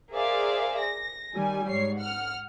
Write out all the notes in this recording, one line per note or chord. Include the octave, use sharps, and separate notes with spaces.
G#4 A#4 C5 D5 E5 F5
A#6
D#3 G3 G#5
G#2 C#5 C7
F#5 F6